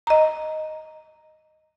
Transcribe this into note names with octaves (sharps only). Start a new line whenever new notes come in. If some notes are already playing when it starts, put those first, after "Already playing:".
D#5 A#5